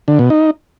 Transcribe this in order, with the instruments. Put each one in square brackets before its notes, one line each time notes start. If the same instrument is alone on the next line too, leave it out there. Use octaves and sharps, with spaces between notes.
[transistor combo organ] D3
B2
D#4